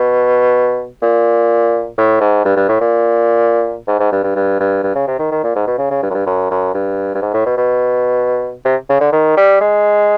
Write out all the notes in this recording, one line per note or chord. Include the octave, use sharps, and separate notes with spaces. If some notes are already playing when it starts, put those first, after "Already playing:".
Already playing: B2
A#2
A2
G#2
G2
G2
A2
A#2
G#2
G#2
G2
G2
G2
G2
G2
C#3
C3
D#3
D#3
A#2
G#2
B2
C#3
C#3
G2
F#2
G2
F#2
F#2
G2
G2
G#2
A2
B2
B2
C3
C#3
D3
D#3
G3
G#3